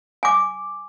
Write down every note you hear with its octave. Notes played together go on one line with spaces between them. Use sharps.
G#5 D6